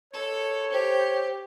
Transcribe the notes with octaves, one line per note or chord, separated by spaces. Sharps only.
A4 C#5
G4 C5